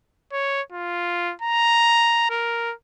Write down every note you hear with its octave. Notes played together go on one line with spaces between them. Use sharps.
C#5
F4
A#5
A#4